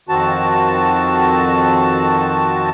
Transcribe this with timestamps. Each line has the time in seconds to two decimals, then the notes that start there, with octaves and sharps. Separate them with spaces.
0.09 F2 D#3 C4 F#4 A5